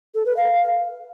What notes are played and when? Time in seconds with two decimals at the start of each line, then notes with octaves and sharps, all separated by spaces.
0.15 A4
0.26 B4
0.37 F5